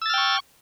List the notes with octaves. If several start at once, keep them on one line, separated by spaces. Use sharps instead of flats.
G5 C#6 E6 F6 A6